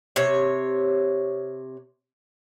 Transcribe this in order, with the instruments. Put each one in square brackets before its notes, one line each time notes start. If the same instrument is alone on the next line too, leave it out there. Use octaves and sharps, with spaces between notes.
[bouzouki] C3 C#5